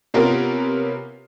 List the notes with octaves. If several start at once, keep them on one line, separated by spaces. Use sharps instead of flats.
C3 B3 C#4 F4 A#4